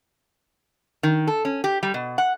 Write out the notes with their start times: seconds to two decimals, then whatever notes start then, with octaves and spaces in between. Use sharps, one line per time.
1.03 D#3
1.27 A4
1.45 C#4
1.64 G4
1.83 G3
1.94 B2
2.18 F#5